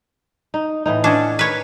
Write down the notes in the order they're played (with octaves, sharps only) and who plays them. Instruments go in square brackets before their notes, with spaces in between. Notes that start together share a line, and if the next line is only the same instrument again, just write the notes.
[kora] D#4
A2 E3 D#4
[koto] C#4 D4 [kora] A4 D#5 F#5
[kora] A#4 [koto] B4 C#5